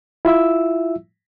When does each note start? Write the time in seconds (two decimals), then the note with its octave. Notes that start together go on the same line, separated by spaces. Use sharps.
0.25 E4 F4 E5 E6